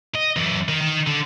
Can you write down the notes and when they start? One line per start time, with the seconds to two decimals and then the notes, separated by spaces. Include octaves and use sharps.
0.15 D#5
0.36 F#2 E3
0.68 D#3
0.81 D#3
1.07 D3